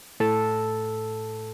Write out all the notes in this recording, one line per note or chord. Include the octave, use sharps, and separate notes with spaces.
A2 A4 A5 E6